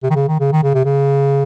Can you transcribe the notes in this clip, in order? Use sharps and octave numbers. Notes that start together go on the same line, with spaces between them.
C3
D#3
C#3
D#3
C#3
D#3
C#3
C3
C#3